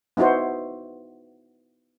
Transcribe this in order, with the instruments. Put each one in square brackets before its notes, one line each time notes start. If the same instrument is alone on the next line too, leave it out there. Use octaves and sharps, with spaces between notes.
[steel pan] B3 D#4 E4 F#4 C5